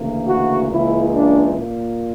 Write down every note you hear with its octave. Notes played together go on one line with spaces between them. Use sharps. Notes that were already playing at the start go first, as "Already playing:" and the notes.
Already playing: D2 C#3 E3 A#3
F#4
C#2 C#3 E3 A#3 E4
D4
A#2 A#3